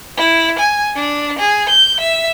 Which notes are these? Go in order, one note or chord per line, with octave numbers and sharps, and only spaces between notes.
E4
G#5
D4
G#4
G6
E5